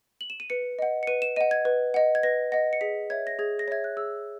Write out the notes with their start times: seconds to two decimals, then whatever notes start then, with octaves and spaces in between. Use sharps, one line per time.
0.21 F#7
0.30 E7
0.40 D#7
0.50 B4 C#7
0.79 D#5 F#5
1.03 C#7
1.07 B4 D#7
1.22 E7
1.36 D#5 F#5 D#7
1.51 G#6
1.65 B4
1.94 D#5 F#5
2.15 G#6
2.23 B4 A#6
2.52 D#5 F#5 A#6
2.73 C#7
2.81 G#4 B6
3.10 C#5 E5 G#6
3.27 A#6
3.39 G#4 G#6
3.59 A#6
3.68 C#5 E5 G#6
3.84 F#6
3.97 G#4 E6